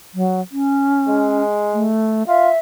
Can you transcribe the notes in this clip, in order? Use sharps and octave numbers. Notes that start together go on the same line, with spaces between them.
F#3
C#4
G#3
A3
F4 E5